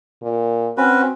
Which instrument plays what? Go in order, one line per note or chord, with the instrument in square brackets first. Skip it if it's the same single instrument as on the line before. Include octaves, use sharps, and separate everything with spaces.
[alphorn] A#2
[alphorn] C4 [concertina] C#4 F#4 B4